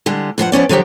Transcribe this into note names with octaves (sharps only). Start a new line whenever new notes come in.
D3 G3 G#3
G2 F3 G#4 F#5
F3 B3 C#4 D5
D3 F3 F#3 G4